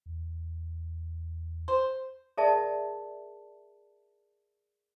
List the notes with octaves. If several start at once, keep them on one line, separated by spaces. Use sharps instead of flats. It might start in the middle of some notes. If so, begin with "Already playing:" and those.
E2
C5
G#4 A#4 D5 E5 A5